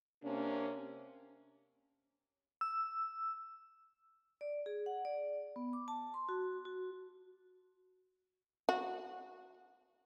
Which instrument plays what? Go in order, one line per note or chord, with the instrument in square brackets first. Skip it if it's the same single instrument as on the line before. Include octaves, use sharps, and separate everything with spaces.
[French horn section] C3 A#3 C#4 D4
[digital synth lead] E6
[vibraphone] D5
G#4
F#5
D5
B3
D6
A5
C6
F#4
F#4
[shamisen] F#4